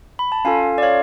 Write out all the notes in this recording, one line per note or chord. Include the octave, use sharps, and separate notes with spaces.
B5
A5
C#4 F4 A4 F5 G#5
D5
C#5 F5